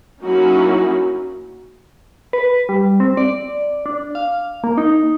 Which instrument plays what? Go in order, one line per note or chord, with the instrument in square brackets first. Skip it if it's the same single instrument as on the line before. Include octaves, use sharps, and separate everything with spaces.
[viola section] F#3 A#3 C#4 D#4 E4 F#4
[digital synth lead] B4
G3
C4
D5
D4
F5
A#3
D#4